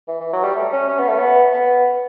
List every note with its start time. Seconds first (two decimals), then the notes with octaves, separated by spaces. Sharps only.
0.08 E3
0.20 E3
0.33 F#3
0.44 G3
0.56 A3
0.72 C#4
0.88 C#4
0.98 B3
1.09 A3
1.19 B3
1.53 B3